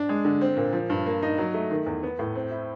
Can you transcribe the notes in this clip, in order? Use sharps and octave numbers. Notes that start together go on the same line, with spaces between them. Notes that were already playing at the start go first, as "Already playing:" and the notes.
Already playing: D4
G#3
D3
C4
A#2
F3
G2
A#3
D#4
F#3
A3
D#3
E2
B3
A2
C4
E4